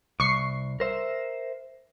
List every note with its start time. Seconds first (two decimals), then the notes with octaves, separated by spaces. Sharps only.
0.20 C2 C#6 C7
0.80 A#4 C5 E5